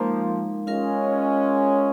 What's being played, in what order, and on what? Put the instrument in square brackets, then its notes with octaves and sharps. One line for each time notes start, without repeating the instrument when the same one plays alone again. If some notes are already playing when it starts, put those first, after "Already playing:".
Already playing: [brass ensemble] F3 A#3 [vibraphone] G#3 D#4 A#4 F5
[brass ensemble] G#3 C#4 [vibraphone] F4 A#4 F5